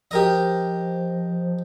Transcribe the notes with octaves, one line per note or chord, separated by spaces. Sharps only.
F3 G4 A#4 D#5